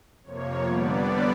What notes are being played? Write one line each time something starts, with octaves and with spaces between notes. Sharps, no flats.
F2 C3 F3 A#3 C#5
D3 G3 B3 D4 D5